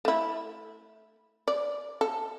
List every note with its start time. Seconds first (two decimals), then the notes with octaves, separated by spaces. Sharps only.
0.05 A3 E4
1.48 D5
2.01 A4